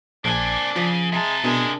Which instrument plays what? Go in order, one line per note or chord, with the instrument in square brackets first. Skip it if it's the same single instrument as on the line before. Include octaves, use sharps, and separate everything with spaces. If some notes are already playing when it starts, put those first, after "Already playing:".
[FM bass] A#1 [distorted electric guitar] A#3 G#5 [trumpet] D4 [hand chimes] C5 A5 F#6
[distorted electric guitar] C#3 [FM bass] F3
[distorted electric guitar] C3 A5 [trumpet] G#3 [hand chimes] E5 A#5
[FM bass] B2 [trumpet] G#3 [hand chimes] D4 A#4